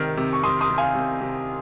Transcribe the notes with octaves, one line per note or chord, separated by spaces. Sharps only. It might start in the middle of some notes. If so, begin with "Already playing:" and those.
Already playing: C3 D#3 C4 F6
C3
C#6
C3 C6 D#6
C6 D#6
C3
F5 G#5
C3
C3